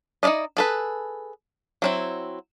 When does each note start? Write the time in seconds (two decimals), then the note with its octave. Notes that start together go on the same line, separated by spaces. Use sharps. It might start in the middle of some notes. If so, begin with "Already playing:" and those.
0.23 D#4 E4 B4 D5 D#5
0.57 G#4 A4 B4
1.82 F#3 C4 E4